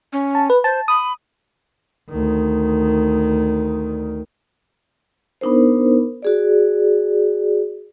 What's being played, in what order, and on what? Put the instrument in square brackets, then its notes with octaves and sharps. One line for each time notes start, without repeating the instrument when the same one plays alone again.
[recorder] C#4
[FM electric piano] A5
B4
[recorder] C5 [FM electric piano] A5
[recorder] B5 [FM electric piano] D#6
[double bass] D2 D#3
[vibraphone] B3 D4 D#4 A#4 C5
F#4 G#4 D5